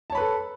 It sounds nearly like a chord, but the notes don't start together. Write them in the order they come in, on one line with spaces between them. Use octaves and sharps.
A5 C#5 B5 B4 A4